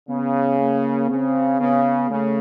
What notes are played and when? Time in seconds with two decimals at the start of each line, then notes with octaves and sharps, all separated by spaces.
0.08 C#3 B3
0.59 A#3
1.09 C#3 C4
1.59 C#3 B3
2.10 C#3 A3